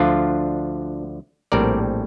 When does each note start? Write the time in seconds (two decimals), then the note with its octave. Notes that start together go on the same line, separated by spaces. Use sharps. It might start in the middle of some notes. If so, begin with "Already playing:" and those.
Already playing: D2 D3 F3 D4 F4
1.52 A#1 A2 G3 C4 A#4 D5